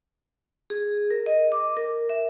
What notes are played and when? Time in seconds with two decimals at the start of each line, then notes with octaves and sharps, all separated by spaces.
0.70 G#4
1.11 A#4
1.26 D#5
1.52 D6
1.77 A#4
2.09 E5